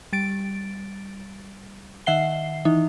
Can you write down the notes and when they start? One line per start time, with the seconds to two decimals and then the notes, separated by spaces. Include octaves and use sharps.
0.13 G3 A6 D7
2.06 D#3 E5 F#5 C7 G7
2.65 E3 D#4